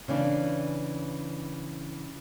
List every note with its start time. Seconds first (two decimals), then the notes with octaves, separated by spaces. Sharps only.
0.08 C#3 E3 D4